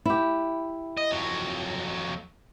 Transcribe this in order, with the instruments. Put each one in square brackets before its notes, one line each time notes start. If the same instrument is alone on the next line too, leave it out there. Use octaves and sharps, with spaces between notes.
[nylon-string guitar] E4 G4
[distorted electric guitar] D#5
F2 F#3